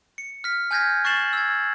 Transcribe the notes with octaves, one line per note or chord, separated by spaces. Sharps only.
C#7
F6 B6
G#5 F6 G6 G#6 A#6 B6
C#6 F#6 A6 C7 E7 F#7
E6 G#6